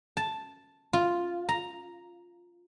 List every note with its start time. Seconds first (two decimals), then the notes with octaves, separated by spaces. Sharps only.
0.17 A5
0.93 F4
1.49 A#5